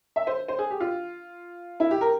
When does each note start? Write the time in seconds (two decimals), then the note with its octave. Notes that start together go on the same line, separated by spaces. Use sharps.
0.16 E5
0.27 C5
0.48 C5
0.59 G#4
0.70 G4
0.80 F4
1.80 E4
1.91 G4
2.01 A#4